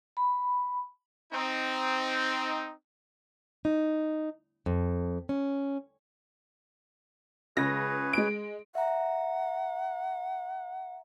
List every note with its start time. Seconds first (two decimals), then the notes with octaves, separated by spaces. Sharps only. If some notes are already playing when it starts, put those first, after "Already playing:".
0.17 B5
1.33 C4 D#4
3.65 D#4
4.66 F2
5.29 C#4
7.57 C#2 C#3 G#4 B4 C#5 A#6
8.13 G#3 D7
8.75 E5 F#5 A#5